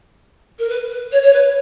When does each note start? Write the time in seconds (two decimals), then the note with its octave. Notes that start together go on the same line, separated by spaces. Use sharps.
0.58 A#4
0.69 B4
0.90 B4
1.12 C#5
1.22 C#5
1.33 B4